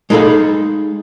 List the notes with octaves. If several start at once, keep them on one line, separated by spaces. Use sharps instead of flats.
G#3 D#4 G#4 A4 F5 B5